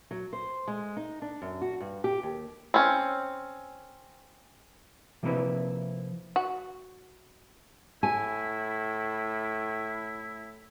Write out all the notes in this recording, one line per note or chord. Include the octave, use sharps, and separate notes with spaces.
F#3
C5
G#3
D#4
D4
F#2
F#4
G2
G4
D#2
C4 C#4
C3 F3 A#3 C4 E4 B4
F#4
A2 E4 G#5